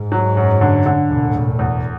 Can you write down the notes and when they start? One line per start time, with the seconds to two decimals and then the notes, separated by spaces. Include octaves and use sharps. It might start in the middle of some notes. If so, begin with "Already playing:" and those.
Already playing: G#2
0.12 F#3
0.37 F#2
0.61 D3
0.86 D3
1.10 E1 A2
1.34 E1
1.59 E2